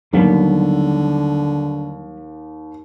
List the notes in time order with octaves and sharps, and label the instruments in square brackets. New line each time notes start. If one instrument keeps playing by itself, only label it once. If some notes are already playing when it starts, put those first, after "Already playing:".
[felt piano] D#2 [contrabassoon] D3 [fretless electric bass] F#3 G3 B3